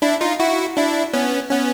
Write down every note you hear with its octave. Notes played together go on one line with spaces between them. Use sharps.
D4 E4
D#4 F4
E4 F#4
D4 E4
B3 C#4
B3 C#4